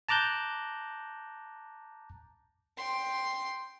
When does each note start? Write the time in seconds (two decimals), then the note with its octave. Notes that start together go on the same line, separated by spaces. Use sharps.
0.09 A5 A#5 D6 F#6 G6
2.77 G5 C6